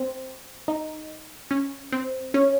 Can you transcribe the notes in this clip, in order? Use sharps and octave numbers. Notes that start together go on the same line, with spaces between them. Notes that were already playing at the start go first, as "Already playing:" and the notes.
Already playing: C4
D#4
C#4
C4
C#4